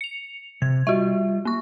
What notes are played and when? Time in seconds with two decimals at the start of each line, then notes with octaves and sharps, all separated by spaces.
0.01 C#7 F7
0.62 C3 G#6
0.87 G3 F4 F#4 E5
1.45 A#3 C#6